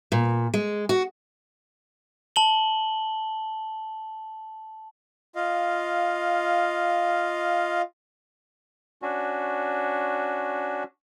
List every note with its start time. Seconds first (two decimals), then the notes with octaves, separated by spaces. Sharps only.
0.12 A#2
0.54 G#3
0.89 F#4
2.36 A5 F#7 G7
5.35 F4 D#5 F5
9.02 C#4 D4 F#4